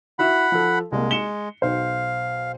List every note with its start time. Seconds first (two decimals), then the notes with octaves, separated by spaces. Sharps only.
0.19 E4 F#4 E5 F#5 B5
0.52 F3 A4
0.92 C2 G#3 A#3
1.11 C#7 E7 G7
1.62 B1 C5 F5